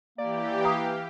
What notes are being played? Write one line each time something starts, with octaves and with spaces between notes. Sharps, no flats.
E3 A#3 G4 D5
F5 A#5 D#6